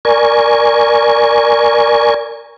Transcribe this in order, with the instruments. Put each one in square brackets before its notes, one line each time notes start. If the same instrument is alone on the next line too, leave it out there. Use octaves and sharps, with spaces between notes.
[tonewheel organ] A#4 D5 G#5 C#6